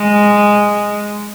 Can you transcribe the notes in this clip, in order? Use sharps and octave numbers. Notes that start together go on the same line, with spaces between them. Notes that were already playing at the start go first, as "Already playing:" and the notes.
Already playing: G#3